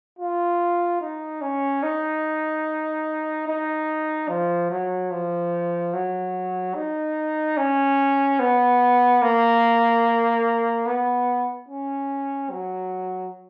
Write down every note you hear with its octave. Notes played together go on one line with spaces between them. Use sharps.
F4
D#4
C#4
D#4
D#4
F3
F#3
F3
F#3
D#4
C#4
B3
A#3
B3
C#4
F#3